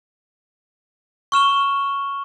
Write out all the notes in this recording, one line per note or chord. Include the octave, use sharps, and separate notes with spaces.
C#6 F6 E7 G7